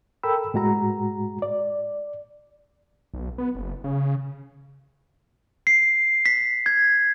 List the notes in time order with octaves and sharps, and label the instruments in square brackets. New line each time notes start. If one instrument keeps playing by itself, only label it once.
[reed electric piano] A4 A#4 G5 B5 E6
A2 G#3 F#4 A#5
D5
[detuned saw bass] B1
B3
F#1
C#3
[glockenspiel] C7
B6
G#6